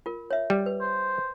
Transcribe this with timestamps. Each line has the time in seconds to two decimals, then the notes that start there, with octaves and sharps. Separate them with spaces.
0.06 F4 A#4
0.30 C#5 E5
0.50 G3
0.66 B4
0.81 C5